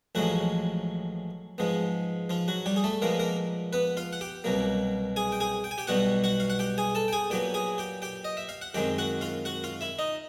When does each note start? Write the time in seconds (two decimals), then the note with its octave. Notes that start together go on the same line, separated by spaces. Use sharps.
0.15 A1 A2 F3 F#3 G#3 F#4
1.58 G#2 F3 G#3 B3
2.30 F3 F4
2.48 F#3 F#4
2.66 G3 G4
2.76 G#4
2.84 A3 A4
3.02 A#2 F3 G#3 A#3 B3 A#4
3.19 A#3 A#4
3.73 B3 B4
3.97 F4 F5
4.13 F#5
4.21 G4 G5
4.44 C2 B2 F#3 A#3
5.16 G#4 G#5
5.32 G5
5.40 G#4 G#5
5.64 G5
5.71 G#5
5.78 G4 G5
5.87 B1 B2 G3 B3 F#4 F#5
6.24 F#4 F#5
6.40 F5
6.50 F#5
6.59 G4 G5
6.78 G#4 G#5
6.95 A4 A5
7.08 G5
7.13 G#4 G#5
7.30 A#2 F#3 B3 G4 G5
7.54 G#4 G#5
7.78 G4 G5
8.02 G4 G5
8.25 D#5
8.37 E5
8.49 F5
8.62 F#5
8.74 F#2 D#3 G#3 C4 G4 G5
8.98 F#4 F#5
9.21 F4 F5
9.45 F#4 F#5
9.64 F4 F5
9.81 E4 E5
9.99 D#4 D#5